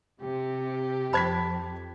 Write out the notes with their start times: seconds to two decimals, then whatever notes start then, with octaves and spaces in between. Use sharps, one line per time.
0.21 C3 G4
1.13 F2 C5 A5 B5 G#6 B6